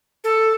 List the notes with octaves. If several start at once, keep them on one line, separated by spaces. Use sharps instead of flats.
A4